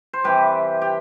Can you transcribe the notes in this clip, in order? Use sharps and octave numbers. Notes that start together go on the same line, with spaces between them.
C5
C3 E3 G3 G4 B4
G4